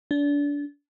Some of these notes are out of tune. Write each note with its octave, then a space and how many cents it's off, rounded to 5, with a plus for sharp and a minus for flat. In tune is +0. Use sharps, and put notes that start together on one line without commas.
D4 -30